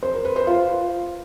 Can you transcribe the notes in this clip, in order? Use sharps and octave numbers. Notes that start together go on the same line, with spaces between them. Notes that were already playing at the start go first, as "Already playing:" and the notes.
C5
A#4
B4
C5
F4